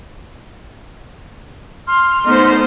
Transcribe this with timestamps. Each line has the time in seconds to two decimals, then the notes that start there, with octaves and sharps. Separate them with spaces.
1.87 C6 F6
2.26 A3 B3 D#4 C5 F6